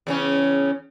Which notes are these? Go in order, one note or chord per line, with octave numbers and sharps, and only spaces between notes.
E2 C#3 C#4